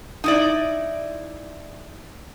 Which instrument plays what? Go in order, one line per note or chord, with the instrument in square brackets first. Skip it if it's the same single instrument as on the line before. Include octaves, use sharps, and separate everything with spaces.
[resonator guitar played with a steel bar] D#4 E4 D5